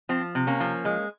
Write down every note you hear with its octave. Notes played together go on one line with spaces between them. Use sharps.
F3 C4
C3
A#3 C#4
F3
G#3